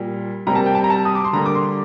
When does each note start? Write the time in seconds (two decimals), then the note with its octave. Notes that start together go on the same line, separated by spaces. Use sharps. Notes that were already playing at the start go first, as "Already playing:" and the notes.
Already playing: A#2 G3 A#3
0.47 C3 G3 A#3 A#5
0.55 A5
0.66 G5
0.75 A5
0.84 A#5
0.90 A5
1.05 D#6
1.15 D6
1.25 C6
1.33 D3 G3 A#3 A#5
1.46 D6
1.55 C6